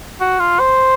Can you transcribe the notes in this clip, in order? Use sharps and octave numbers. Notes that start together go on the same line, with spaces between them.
F#4
F4
C5